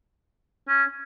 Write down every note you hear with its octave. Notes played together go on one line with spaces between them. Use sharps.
C#4